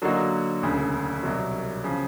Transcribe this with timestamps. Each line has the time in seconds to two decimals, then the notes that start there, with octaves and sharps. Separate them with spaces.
0.02 D3 F#3 A#3 D#4 F#4
0.62 E1 D2 C#3
1.23 C2 B2 F#3
1.84 C#3 F3